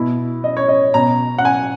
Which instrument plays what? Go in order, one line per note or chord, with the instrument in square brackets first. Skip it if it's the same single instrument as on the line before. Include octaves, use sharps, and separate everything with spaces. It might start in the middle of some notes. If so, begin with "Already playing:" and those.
Already playing: [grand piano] B2 E4
D#5
C#5
D#5
B2 A#5
F#5
G#5